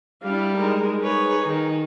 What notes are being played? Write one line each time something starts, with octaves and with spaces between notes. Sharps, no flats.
G3 D4 E4 F5
G#3 D#4 A#4
D#4 G#4 B4 C#5
D#3